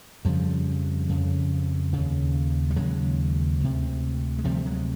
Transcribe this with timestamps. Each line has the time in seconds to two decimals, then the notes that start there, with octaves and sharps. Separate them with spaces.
0.25 F2 C#3 F3 G3
1.09 F2 C#3
1.93 D#2 C#3
2.70 G3
2.76 D#2 C#3 F#3 G#3
3.61 D2 C3
4.39 G#3
4.44 D2 C3 F3 G3
4.66 F#3 G#3